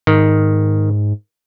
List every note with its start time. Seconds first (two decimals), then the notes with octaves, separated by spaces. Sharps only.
0.07 G#2 D#3